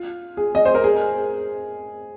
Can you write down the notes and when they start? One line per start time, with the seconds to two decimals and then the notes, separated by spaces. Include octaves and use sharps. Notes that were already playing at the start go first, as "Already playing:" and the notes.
Already playing: F4
0.37 G#4
0.55 D#5
0.65 C5
0.75 A#4
0.84 G#4